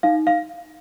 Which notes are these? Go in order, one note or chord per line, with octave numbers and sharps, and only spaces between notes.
D#4 F5
F5